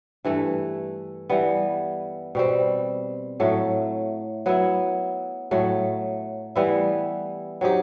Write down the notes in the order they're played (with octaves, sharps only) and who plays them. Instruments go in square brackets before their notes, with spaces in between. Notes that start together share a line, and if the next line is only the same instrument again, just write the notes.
[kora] G2 E3 A3
E3 G3 B3
B2 G3 C4
A2 F#3 A3
F#3 B3 E4
A2 F#3 A3
E3 G3 B3 E4
F#3 C4 D#4 G4